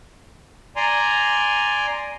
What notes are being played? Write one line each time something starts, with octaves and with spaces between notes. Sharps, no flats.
D5 G#5 A#5 C6